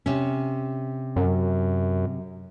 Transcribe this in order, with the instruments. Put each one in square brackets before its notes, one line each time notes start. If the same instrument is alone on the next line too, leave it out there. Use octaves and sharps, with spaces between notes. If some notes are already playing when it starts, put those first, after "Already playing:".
[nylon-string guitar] C3 C#4
[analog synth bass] F#2